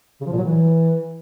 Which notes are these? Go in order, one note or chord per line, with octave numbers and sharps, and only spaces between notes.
C#3
F3
A#2
F#3
E3